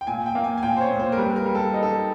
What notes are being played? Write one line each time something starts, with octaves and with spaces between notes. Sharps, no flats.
G5
A#2 G#5
G5
A#3
G#5
G#5
A#2 G5
C5
C#5
A#2
C5
A#4
G3 B4
B4
A#4
G3
A4
D#4
A4